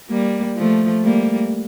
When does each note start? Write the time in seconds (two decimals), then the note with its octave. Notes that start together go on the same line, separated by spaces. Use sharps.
0.10 G3 A#3
0.57 F3 A3
1.03 G3 A#3